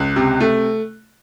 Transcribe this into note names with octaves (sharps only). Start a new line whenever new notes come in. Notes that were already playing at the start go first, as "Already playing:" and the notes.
Already playing: C#2 F#6
C3
A3